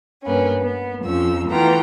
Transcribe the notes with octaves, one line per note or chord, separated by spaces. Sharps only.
G2 A#3 B3 C#4
B3
F2 F3 C#4 E6
E3 A3 B3 F4 G5 A#5